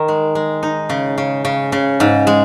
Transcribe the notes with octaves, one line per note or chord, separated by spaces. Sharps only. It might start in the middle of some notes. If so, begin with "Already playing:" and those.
Already playing: D#3
G#3
G#3
D#4
C#3
C#3
C#3
C#3
G#2
G#3